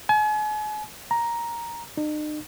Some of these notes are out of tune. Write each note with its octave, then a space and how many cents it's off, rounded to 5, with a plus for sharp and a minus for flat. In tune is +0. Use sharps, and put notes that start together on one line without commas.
G#5 +40
A#5 +5
D#4 -45